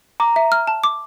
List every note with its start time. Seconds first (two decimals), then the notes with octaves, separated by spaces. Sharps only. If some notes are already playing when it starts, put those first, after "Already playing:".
0.20 A#5 D6
0.36 E5
0.52 F6
0.67 A5
0.84 D6